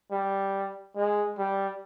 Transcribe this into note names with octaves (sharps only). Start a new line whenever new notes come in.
G3
G#3
G3